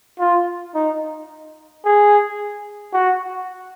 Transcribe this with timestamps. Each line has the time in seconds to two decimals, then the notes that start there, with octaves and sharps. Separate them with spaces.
0.19 F4
0.75 D#4
1.85 G#4
2.93 F#4